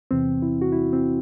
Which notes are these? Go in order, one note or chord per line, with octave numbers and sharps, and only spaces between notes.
E2 C3 E3 C4
E4
F#4
E4
C4